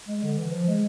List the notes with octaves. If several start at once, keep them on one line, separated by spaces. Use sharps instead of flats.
G#3
D3
E3
F3
G#3